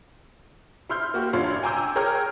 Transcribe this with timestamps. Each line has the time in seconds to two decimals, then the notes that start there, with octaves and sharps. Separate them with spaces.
0.89 E4 C6 F6 G6
1.14 A#3 F#4 G4
1.33 A1 D4 E4 F4 C#5 C6
1.63 G5 G#5 A#5 D6 E6 G6
1.95 G#4 A#4 C#5 G5 A#5 F6